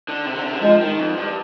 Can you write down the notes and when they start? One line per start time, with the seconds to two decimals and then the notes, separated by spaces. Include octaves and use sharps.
0.08 D3
0.26 C3
0.35 D3
0.44 C3
0.53 D3
0.62 F3 G#3
0.80 D#3
0.99 F2
1.17 G2